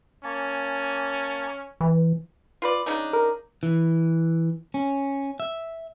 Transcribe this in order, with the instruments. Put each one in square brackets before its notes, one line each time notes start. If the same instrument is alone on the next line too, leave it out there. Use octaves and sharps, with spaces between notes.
[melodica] A#3 G#5 A5 [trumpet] C#4
[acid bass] E3
[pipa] F4 B4 D5
C#3 D4 D#4
[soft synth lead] A#4
[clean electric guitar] E3
C#4
E5